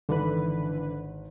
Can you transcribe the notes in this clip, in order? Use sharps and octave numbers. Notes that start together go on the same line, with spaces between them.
G#1 D3 E3 B4